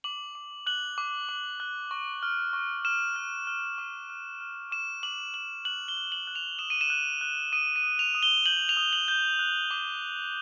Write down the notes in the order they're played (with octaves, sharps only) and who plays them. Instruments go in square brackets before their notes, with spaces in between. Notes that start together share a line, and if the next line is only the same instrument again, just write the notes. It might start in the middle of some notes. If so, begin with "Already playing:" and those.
[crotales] D6 F#7
D6
F#6 F#7
D6
D6
F#6
C#6
F6
C#6
F6 E7
F6
F6
D6
F6
F6
D6 E7
D6 F#7
D6 F#7
F#6 F#7
G7
F#6
F#7
F#6
F7
D#6 E7
D#7
E7
F#6
F#6
D#6 D#7
D#7
D#6
F7
D#6
G7
G6 F#7
F7
D#6
F#7
G6
F#6
D6